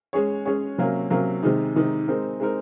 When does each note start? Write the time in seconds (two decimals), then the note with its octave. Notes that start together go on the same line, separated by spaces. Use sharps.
0.13 G#3 C#4 G#4 C#5
0.46 G#3 C#4 G#4 C#5
0.78 C3 F#3 A#3 C#4
1.10 C3 F#3 A#3 C#4
1.43 C3 D#3 G#3 D#4
1.76 C3 D#3 G#3 D#4
2.08 G#3 C4 D#4 A#4
2.40 G#3 C4 D#4 A#4